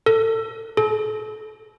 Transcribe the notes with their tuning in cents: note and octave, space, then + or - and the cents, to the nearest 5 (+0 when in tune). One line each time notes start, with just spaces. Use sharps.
A4 +25
A4 -40